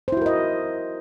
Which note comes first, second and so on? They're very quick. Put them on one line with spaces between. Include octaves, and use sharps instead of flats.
C5 E4 F#4 A#4 D#5